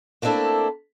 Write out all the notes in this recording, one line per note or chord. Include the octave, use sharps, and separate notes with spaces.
A3 A#3 C4 D4 E4 A4